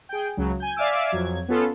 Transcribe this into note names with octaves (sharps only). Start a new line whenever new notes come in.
G#4 G5
C#2 C#3 F#3
G#5 G6
D5 E5 F5 G#5 D6 E6
F2 F#3 G#6
B3 C#4 F4 A4